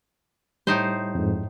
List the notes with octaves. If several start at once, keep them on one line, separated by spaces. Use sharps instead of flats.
A2 G3 D#4 C5
F2 G#2